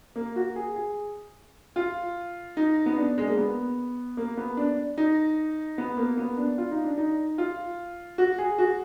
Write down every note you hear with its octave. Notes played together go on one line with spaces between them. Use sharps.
A#3
F#4
G#4
G#4
F4
D#4
B3
D4
G#3
A#3
B3
A#3
B3
D4
D#4
B3
A#3
B3
D4
F4
D#4
D4
D#4
F4
F#4
G#4
F#4